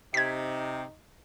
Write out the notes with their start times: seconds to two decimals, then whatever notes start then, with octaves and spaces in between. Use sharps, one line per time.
0.14 C3 D#4 G#6 B6